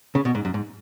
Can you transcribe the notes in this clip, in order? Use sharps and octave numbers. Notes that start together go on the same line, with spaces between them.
C#3
B2
G#2
F#2
G#2